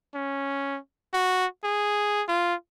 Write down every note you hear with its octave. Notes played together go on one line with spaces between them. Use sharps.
C#4
F#4
G#4
F4